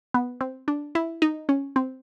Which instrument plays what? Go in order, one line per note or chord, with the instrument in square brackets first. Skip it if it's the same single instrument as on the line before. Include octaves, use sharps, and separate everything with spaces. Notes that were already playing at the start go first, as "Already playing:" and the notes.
[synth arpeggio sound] B3
C4
D4
E4
D#4
C#4
C4